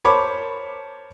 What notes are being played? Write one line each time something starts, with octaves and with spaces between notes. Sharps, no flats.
A#4 C5 C#5 A5 B5 D6